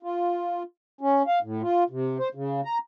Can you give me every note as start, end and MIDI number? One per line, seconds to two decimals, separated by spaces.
0.03 0.63 65
1.01 1.22 61
1.27 1.39 77
1.43 1.62 45
1.62 1.84 65
1.90 2.18 48
2.19 2.29 72
2.35 2.61 49
2.65 2.78 82